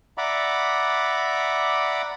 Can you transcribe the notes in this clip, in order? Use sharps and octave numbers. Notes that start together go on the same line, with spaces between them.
D5 E5 F#5 A#5 B5 D6